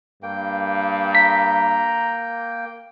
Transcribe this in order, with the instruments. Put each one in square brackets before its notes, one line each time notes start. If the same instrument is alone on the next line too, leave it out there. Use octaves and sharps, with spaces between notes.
[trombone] G2 [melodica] A#3 G5
[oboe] A#5 [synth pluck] B6